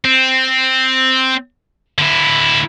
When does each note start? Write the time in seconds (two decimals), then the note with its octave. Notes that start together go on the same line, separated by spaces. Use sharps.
0.05 C4
1.98 D3 E4